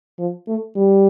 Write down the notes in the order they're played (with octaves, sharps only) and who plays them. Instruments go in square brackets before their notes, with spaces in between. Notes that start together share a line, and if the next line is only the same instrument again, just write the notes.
[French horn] F3
A3
G3